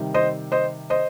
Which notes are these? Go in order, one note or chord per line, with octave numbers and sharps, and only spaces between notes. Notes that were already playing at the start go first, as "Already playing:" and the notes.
Already playing: C3 D#3 G3
C5 D#5
C5 D#5
C5 D#5